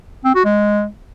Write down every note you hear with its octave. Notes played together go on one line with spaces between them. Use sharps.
C4
F#4
G#3